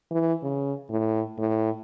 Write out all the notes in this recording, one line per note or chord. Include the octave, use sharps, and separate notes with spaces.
E3
C#3
A2
A2